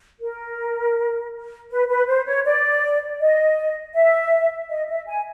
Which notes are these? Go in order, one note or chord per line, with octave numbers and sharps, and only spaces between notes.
A#4
B4
B4
C5
C#5
D5
D#5
E5
D#5
E5
G#5